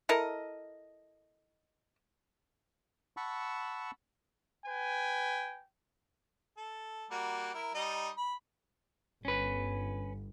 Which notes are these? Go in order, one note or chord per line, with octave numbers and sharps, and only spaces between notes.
E4 A4 A#4 D#5
F#5 A5 B5 C#6 E6
B4 G5 G#5
A4
G3 A#3 F#4
E4 A#4
G3 D#4 D#5
B5
G1 C#4 B4